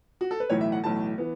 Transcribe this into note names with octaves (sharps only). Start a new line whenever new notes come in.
F#4
A4
B4
B1 A2 E3 A3 C#5
E5
F#5
B1 A2 E3 A3 A5
E3 B3